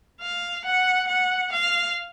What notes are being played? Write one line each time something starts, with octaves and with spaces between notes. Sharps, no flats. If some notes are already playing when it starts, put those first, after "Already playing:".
F5
F#5
F#5
F5